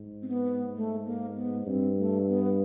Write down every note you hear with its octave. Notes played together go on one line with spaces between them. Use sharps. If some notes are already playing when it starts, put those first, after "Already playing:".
Already playing: G#2
C4
B3
A3
A#3
B3
G2 C4
A3
B3